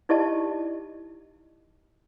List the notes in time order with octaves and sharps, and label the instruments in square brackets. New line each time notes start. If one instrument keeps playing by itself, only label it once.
[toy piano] D#4 E4 G4 D5 D#5 A5